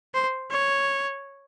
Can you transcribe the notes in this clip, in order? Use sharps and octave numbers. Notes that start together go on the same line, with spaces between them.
C5
C#5